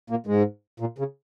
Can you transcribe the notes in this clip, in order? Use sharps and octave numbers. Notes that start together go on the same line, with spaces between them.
A#2 A#3
G#2 G#3
A#2
C#3